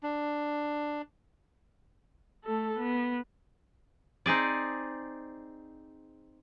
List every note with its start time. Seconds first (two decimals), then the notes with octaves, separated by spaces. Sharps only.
0.03 D4
2.45 A3 A4
2.78 B3
4.26 C4 D#4 G#4 D5